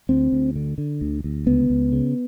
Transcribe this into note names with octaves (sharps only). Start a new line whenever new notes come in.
D2 C4
D2
D3
D3
D2
D2
C#2 B3
C#2
C#3